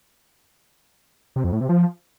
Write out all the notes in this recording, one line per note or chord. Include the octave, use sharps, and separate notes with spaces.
C3
F2
A2
C3
F3